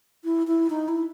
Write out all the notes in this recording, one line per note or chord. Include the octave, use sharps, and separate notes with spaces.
E4
E4
D#4
E4